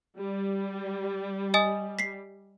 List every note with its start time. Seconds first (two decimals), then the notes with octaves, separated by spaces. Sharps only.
0.19 G3
1.54 D#5 G#5 D#6
1.99 B6 C7